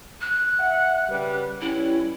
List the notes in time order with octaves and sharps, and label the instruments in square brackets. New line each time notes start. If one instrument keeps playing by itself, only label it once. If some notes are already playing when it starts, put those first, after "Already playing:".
[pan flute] F#6
[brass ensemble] E5 F#5
C#3 G3 B4
[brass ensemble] G3 C#4 [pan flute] E4